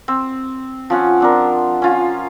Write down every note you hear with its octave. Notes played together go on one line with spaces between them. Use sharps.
C4
F3 C#4 F#5
C4 D4 A#4
C#4 F4